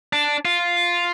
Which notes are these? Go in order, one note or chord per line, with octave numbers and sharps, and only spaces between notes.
D4
F4